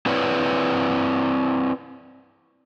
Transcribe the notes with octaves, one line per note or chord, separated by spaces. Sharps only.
C4 E4 B4 C#5 D5